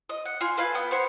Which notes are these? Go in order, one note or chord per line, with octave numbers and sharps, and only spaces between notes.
D#5
F#5
F4 G#5 C6
A4 B4 F5 G#5
B3 G5
C5 C#5 F#5 B5